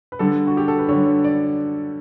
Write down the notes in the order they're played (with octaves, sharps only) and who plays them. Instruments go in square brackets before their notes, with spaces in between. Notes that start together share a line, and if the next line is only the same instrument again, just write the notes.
[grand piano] B4
D3 G3 A4
F#4
G4
A4
B4
D3 G3 C#5
D5